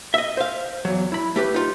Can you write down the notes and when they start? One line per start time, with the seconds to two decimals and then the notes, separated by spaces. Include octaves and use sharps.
0.14 D#5 E5
0.37 C5 F5
0.85 E2 F#3
1.12 E4 B5
1.36 A3 G4 B4
1.54 D#4 F4